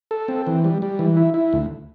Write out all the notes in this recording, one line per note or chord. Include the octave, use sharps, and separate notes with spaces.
A4
C4
E3
G3
G3
E3
E4
E4
D2